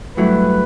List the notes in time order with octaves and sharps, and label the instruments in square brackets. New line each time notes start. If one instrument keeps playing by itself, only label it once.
[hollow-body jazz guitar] G2 F#3 A3 E4 [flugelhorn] B4